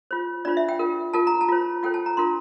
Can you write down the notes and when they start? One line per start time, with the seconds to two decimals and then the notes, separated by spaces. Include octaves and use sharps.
0.11 F4 C5
0.45 D4 F4 C5 D5
0.57 E5
0.69 G5
0.79 F4 A#4
1.14 F4 A#4 A5
1.27 A#5
1.41 A5
1.49 F4 C5
1.83 F4 A4 C5 G5
1.94 A5
2.06 A#5
2.17 D4 F4 A#4 C6